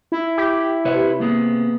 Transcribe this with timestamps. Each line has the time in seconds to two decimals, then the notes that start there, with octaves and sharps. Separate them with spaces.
0.12 E4
0.38 G4
0.85 C3 B4 C#5
1.20 A#3 B3 G#4